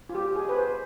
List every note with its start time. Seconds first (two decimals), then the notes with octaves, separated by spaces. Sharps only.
0.09 F4
0.15 G4
0.36 G#4
0.49 B4
0.55 C5